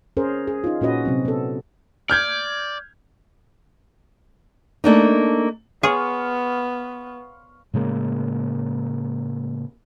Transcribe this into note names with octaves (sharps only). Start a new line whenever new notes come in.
C#4 G#4 A#4 C5
G#4
D#4 F4
A#2 C#4 F#4 B4 D#5
C3 F#3 C4
B3 A4
D5 F6 G6 G#6
A3 A#3 D4 D#4
B3 G#4 F5 C6 C#6
A2 C#3 G#3 A#3